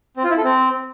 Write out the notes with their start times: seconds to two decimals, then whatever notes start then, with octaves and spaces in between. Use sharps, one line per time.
0.17 C4
0.23 F4
0.30 E4
0.37 A4
0.44 C4